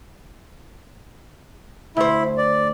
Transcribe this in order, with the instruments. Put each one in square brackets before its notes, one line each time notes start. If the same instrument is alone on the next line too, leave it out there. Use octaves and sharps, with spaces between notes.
[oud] D2 C5 [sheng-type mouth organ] E4
[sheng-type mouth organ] D5